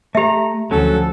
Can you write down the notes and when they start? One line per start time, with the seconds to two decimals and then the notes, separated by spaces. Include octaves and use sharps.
0.15 A3 G4 E5 A#5
0.71 D2 F3 F#3 C#4 F#4 A4